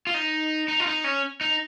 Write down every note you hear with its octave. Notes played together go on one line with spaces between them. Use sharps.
F4
D#4
D#4
F4
D#4
C#4
D#4